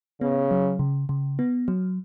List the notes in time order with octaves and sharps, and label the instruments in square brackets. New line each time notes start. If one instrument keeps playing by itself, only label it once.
[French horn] C#3 [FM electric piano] B3
[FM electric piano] F#3
C#3
C#3
B3
F#3